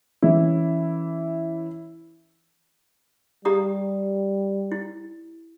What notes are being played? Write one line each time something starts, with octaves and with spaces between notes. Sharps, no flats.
E3 C#4 E4
G3 G4 A#5 D#6
E4